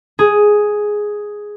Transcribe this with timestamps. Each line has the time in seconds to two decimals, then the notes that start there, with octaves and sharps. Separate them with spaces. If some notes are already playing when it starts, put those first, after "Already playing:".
0.19 G#4